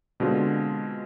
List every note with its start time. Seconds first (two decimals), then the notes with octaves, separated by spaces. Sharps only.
0.20 B2 D3 G#3 C4 F4